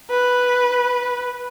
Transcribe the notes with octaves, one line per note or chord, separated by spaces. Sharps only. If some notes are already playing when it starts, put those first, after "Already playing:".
B4